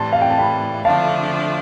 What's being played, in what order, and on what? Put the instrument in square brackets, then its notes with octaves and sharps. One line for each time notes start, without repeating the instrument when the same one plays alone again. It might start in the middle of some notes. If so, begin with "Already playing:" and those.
Already playing: [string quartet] A2 E3 G3 [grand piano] A5 C6
[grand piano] F5
G5
A5
G5 B5
[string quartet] D3 F3 A3 D4 [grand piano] F5 A5